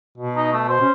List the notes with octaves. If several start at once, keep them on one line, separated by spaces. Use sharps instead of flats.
B2
D#4
A3
C5
C#4